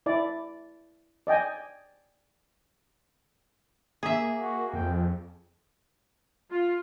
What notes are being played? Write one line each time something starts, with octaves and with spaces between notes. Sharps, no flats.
E4 D5
D5 D#5 G5 G#5
A#3 G#4 E5
F#4
F2 G5
F4